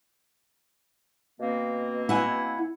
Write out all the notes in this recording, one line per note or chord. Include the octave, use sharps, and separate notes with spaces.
B2 A#3 C4
E4 F#5 G#5